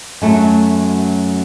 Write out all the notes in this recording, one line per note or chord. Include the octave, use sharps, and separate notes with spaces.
F#2 F#3 A3